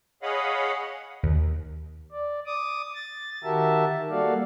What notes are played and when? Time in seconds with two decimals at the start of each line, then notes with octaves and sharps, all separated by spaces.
0.23 G#4 C#5 D#5 F5 F#5 B5
1.23 D#2
2.12 D5
2.46 D6 D#6
2.94 A6
3.44 D#3 F#4 G4 A#4 E5 A5
4.10 G3 A#3 F#4 A4 D5 F5